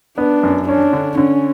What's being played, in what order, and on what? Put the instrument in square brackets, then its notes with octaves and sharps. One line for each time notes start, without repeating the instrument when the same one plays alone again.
[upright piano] B3 [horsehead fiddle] D4
[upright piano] F#2
[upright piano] C#4 [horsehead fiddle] D4
[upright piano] D3
[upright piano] D3 [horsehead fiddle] C#4